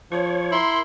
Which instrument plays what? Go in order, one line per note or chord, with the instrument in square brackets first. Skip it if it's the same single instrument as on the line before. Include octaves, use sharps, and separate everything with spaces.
[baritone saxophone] F3 [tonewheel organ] C#5
[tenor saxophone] E4 [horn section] A#4 C6